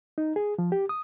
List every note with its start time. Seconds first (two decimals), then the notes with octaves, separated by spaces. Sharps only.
0.18 D#4
0.36 G#4
0.58 F3
0.72 G4
0.89 D#6